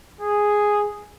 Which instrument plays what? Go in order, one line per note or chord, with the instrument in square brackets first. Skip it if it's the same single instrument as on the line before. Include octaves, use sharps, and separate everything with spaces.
[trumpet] G#4